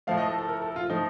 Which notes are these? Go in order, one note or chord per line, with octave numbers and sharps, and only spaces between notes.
A2 F3 A3 F5
D#5
A4
A4
A#4
A4
F4
A2 F3 A3 D#4